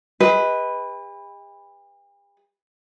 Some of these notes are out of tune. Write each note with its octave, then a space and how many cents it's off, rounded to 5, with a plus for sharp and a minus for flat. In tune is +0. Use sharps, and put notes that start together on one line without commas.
G4 +45 B4 +0 D#5 +25